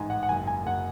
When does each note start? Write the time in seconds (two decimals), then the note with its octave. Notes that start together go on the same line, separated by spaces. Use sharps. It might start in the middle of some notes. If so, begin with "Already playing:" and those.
Already playing: A1 G#2 G#5
0.10 F#5
0.23 F#5
0.29 F#1 G#5
0.47 G#5
0.66 F#1 F#5